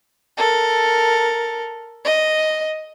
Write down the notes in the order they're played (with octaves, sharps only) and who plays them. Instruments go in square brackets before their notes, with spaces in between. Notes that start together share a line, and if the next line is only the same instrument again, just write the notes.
[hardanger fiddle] A4 A#4
D#5